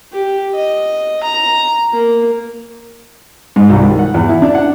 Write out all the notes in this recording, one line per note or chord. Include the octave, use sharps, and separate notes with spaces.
G4
D#5
A#5
A#3
G#2
C2
D#3
F#5
E2
E4
D4
F#5